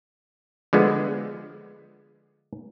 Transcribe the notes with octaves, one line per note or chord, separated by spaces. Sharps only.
D3 F3 G#3 B3